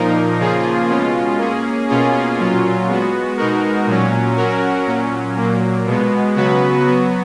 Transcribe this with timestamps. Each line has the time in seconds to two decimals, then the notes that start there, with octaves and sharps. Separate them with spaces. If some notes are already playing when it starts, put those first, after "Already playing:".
Already playing: A#2 F3 A#3 D#4 A#4
0.39 C#3 F3 A#3 F4 G#4
0.89 B2 G#3 C#4 F4
1.38 A#3 C#4 G#4
1.89 B2 A#3 C#4 F4 G#4
2.38 A#2 F#3 C#4 F4
2.88 G#3 B3 F#4
3.37 B2 G#3 D#4 F#4 A#4
3.87 A#2 F#3 C#4
4.37 F#3 C#4 F#4 A#4
4.87 A#2 F#3 C#4
5.37 A#2 F#3 A#3
5.86 B2 G#3 B3
6.36 C#3 F#3 B3 F#4 B4
6.86 F#3 B3 F#4